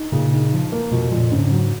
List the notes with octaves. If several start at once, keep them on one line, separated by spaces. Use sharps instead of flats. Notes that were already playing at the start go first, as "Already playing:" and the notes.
Already playing: D#4
A#2 C#3
D#4
F3
A#3
F2 B2
F2 A#2
G#2 C#3
F#3